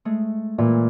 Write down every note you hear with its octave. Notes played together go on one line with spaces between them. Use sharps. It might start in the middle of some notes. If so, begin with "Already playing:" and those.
G#3 A3
A#2 E3